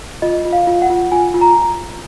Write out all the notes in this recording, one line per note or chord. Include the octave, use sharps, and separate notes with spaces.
F4 D#5
F4
F5
F4
F#5
F4
F4 G#5
F4
A#5